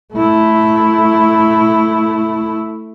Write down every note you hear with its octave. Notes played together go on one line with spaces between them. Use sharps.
A3 E4